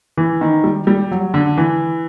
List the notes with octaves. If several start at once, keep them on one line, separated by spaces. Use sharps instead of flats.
E3
D#3
G3
G3
F#3
D3
E3